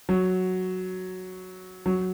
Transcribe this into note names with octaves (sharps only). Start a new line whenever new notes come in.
F#3
F#3